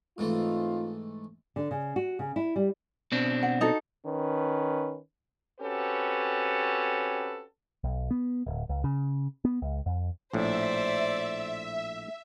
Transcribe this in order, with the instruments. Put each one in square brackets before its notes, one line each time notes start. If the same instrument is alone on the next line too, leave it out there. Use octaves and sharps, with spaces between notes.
[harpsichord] G#2 E3 A3 [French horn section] C4 D#4 F4
[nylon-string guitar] D3
C#3
F#4
C#3
E4
G3
[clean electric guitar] B2 C4 D4
[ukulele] F#5
D#4 F#4 A4
[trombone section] D#3 C#4 B4
[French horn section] C4 C#4 F#4 G4 A4 B4
[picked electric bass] B1
B3
D1
C#2
C#3
B3
C#2
F2
[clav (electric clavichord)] A#1 A2 [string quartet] C5 D5 [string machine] E5